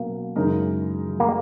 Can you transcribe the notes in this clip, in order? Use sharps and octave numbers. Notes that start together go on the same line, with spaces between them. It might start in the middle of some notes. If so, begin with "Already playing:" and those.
Already playing: B2 F#3 A#3 C#4 F#4
F#2 C#3 G#3 D#4 A#4
A#3